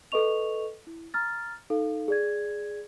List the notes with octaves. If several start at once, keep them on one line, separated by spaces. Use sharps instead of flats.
A4 B4 D#5 C#6 F7
E4
A#5 F6 A6
D#4 A4 F5
G#4 D5 G#6